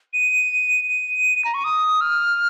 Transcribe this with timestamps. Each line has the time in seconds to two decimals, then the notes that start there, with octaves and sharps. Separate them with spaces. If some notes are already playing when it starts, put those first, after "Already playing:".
0.13 D#7
0.89 D#7
1.45 A#5
1.54 C#6
1.64 D#6
2.01 F6